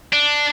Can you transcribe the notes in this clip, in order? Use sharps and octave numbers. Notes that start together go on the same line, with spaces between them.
D4